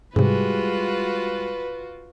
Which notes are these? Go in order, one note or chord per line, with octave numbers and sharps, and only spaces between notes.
G#2 C3 G3 G#3 F4 F#4 B4